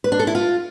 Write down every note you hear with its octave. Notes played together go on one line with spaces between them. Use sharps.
B4
D4
A4
E4
F4